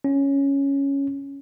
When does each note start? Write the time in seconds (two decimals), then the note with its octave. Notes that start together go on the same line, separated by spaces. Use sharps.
0.04 C#4